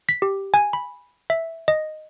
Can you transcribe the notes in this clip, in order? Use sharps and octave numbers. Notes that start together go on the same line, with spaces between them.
B6
G4
G#5
B5
E5
D#5